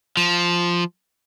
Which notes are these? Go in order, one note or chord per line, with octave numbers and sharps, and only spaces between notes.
F3